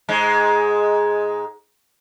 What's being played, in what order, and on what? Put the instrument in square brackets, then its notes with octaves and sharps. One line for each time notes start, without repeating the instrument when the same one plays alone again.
[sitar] G#2 G#3